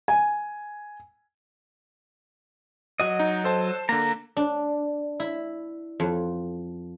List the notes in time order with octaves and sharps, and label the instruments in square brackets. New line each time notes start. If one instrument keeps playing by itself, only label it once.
[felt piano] G#5
[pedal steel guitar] F#3 F#4 D#5
[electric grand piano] D#4
A4 C5 A5
[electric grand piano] D3 A#3 [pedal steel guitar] A#5
[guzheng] D4
E4
F2